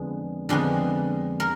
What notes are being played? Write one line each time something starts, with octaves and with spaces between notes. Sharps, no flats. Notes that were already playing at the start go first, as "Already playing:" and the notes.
Already playing: F2 D3 G#3 B3
F2 D3 G#3 B3
A#4